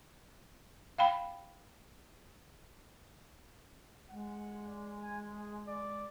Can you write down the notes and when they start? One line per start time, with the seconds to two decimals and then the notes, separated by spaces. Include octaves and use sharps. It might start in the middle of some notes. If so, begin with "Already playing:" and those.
0.98 F5 G5 B5
4.11 G#3 F#5
4.67 D5
5.01 G#5
5.31 G#4
5.68 D5